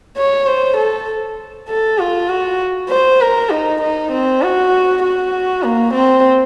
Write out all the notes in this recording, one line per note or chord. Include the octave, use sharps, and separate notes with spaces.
C#5
C5
A4
A4
F4
F#4
C5
A#4
D#4
D#4
C4
F#4
F#4
A#3
C4